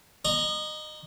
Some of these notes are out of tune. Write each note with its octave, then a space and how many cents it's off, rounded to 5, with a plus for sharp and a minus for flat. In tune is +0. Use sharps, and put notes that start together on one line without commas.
D#5 -25 A#5 +15 C#6 +0